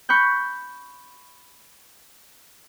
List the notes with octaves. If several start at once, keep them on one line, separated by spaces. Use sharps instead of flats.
B5 C#6 F#6 G6